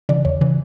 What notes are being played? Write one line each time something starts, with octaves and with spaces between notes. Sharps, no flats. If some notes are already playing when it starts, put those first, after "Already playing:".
C#3 E3 D5
E2 C#5
C#3 E3